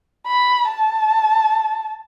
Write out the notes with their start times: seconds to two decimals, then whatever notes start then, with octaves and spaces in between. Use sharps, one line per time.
0.27 B5
0.69 A5